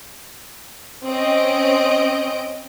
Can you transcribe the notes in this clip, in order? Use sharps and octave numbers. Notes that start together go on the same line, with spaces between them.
C4 C#4 D#5 D7